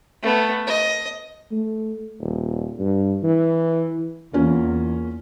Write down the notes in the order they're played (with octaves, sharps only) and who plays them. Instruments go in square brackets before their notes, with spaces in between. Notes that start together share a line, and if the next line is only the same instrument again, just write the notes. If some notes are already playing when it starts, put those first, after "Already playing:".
[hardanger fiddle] A3 B3
D#5
[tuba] A3
D#1
G2
E3
[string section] E2 [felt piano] A#3 C#4 F4